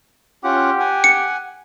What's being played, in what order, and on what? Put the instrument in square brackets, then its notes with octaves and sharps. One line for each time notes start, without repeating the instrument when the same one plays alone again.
[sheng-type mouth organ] C#4 F4 F#5 [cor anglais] G4
[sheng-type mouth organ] F#5 G#5
[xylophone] C#7